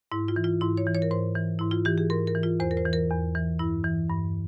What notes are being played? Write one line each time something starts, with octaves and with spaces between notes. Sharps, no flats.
G#2 E4
F4
E3
F4
G#2 E4
C#5
E3
C#5
A#4
G#2 C5
E3
G#2 E4
F4
E3 G4
G#4
G#2 A#4
A#4
E3
F4
E2 C5
A#4
C5
E3
A#4
E2
E3
G2 E4
E3
G2